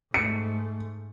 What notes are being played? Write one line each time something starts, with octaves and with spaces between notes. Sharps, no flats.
G#2 A3 C#7